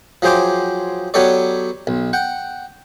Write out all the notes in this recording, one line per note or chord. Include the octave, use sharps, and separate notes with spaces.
F3 F#3 G#4 C5 G5 D6
F#3 B3 G4 A4 C#5 D5
B1
F#5 G5